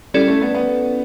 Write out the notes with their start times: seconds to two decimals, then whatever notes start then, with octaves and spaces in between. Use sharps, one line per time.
0.14 G3 C#4 E4 A4 D5
0.28 A3
0.42 B3
0.54 B3